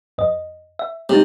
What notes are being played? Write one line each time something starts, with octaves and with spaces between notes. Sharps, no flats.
F2 D#5
E5
C3 G#3 D#4